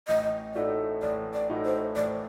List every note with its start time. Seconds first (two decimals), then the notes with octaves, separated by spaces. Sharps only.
0.08 A1 D#5
0.55 A2 A3 D#4 F#4 D5
1.02 A1 D5
1.34 D5
1.49 A2 A3 D#4 F#4
1.65 C5
1.96 A1 D5